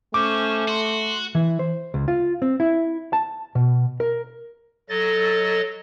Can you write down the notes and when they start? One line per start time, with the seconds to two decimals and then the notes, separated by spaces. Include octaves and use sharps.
0.14 A3 C#4 C5 C#6 D6
0.68 F#4 C6
1.35 E3
1.59 C5
1.94 C#2
2.08 F4
2.42 C4
2.60 E4
3.13 A5
3.55 B2
4.00 A#4
4.89 F#3 A4 D#5 A6